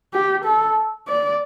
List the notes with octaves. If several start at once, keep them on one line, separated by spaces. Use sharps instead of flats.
G4
A4
D5